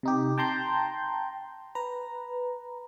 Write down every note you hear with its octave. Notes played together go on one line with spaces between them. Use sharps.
C3 D#4 G4
G5 A5 A#5 C6 G6
B4 A#5